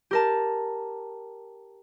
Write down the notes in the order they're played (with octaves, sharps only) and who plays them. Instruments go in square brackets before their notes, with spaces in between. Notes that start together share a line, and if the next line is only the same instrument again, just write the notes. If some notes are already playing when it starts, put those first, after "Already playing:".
[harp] G4 A#4 A5